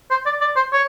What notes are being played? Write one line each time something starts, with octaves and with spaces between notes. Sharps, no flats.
C5
D5
D5
C5
C#5